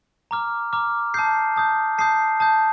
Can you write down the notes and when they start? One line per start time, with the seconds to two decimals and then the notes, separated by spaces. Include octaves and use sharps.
0.31 A#5 D6 F6
0.73 A#5 D6 F6
1.14 A5 D#6 G6 C7
1.56 A5 D#6 G6
1.98 A5 D#6 G6 C7
2.40 A5 D#6 G6